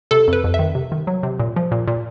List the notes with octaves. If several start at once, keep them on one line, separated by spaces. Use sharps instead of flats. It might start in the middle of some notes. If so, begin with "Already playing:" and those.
C3 A4
F2 B4
F2
E5
D#3
C3
D#3
F#3
C3
A#2
F3
A#2
A#2